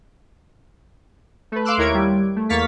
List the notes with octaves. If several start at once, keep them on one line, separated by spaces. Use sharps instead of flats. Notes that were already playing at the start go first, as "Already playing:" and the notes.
A3 B4
F5 C6 D6 E6 F#6
D#2 E4 A#4 C#5 G#6 D7
G3
A3
E2 A#3 F5 C#6 A6 B6